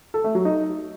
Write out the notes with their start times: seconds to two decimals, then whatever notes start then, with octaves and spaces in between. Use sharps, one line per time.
0.14 A4
0.24 A3
0.35 F#3
0.45 D#4